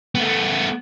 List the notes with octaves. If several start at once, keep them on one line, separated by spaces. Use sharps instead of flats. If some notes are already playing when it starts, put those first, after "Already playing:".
A3 B3